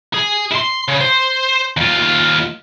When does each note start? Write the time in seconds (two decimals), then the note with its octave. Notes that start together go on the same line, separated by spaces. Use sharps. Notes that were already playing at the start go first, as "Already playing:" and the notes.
0.14 G#4
0.52 E4 C6
0.88 C#3
1.01 C5
1.77 D#2 F4